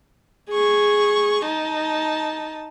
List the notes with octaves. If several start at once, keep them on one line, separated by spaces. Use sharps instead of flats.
G#4 C#6
D#4 A5